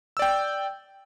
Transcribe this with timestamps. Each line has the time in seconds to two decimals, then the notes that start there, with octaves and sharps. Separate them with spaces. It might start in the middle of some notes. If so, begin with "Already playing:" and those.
0.17 E6
0.19 D5
0.22 G5